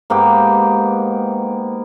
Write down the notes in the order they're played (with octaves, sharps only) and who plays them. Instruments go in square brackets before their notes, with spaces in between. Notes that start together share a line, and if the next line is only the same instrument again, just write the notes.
[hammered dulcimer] G#2 A#3 B3 G4